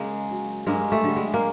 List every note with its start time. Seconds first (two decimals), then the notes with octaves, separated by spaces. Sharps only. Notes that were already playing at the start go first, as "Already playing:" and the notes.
Already playing: C#3 G#3 A#3
0.31 F#3
0.67 G2 G#3 A#3
0.92 A3
1.04 D3 G3
1.16 G#3
1.34 A#3